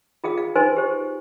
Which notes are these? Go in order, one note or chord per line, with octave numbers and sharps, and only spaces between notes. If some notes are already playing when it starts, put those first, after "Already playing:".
F4 G#4 F5 D#6
F5
D#4 B4 C5 G#5 C6
G4 C5